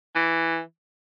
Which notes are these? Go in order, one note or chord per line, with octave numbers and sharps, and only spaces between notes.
E3